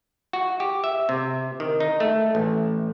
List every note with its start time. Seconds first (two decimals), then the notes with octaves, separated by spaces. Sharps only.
0.33 F#4
0.60 G4
0.84 E5
1.09 C3
1.60 D#3
1.80 D#4
2.00 A3
2.35 A1